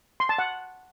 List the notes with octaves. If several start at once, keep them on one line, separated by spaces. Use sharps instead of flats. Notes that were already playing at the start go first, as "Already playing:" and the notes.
C6
A5
F#5